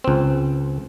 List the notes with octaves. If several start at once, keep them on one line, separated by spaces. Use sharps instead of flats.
C#2 C4